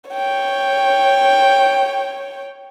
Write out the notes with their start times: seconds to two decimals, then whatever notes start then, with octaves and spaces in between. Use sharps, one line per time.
0.11 C#5 G5